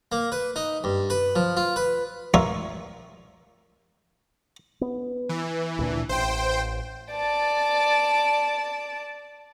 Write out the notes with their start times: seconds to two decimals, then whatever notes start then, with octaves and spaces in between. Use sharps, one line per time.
0.12 A#3
0.32 B4
0.56 D#4
0.84 G2
1.10 B4
1.36 F3
1.57 F4
1.76 B4
2.34 F4 A#4 C#5 E5
4.81 B3
5.29 E3
5.79 D2 A#2 D4
6.09 A1 C5 G5
7.12 D5 A5